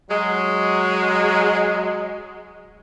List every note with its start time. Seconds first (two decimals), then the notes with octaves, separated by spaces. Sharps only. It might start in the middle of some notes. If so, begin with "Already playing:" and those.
0.10 F#3 G#3